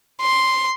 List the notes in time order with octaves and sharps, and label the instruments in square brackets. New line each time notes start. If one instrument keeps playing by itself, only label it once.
[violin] C6